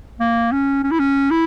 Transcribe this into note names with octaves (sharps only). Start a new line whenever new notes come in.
A#3
C#4
C#4
E4
C#4
E4